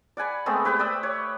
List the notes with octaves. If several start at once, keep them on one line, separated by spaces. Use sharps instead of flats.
D5 F#5 G#5 B5
G#3 A3 B3 C4
G4 B4 C5 G5
D5 G5 D#6 E6
C#5